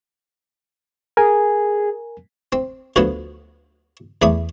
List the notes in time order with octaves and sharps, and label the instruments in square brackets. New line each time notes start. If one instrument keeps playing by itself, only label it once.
[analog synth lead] G#4 [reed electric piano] A#4 G#5
[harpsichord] C4
D2 D3 F3 F#3 B3
E2 A3 D5 B5 D#6